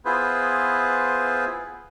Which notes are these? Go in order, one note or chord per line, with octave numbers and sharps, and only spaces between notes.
B3 E4 F4 G#4 B4 C5